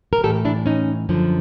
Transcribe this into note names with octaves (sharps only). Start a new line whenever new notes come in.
A#4
A2 E3 G4 A4
D4 E4
C#4 D#4
F#2 D3 F3